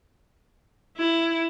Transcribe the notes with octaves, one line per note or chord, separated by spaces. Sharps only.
E4